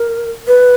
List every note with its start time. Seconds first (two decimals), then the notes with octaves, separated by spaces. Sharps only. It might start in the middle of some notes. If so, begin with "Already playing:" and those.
Already playing: A#4
0.48 B4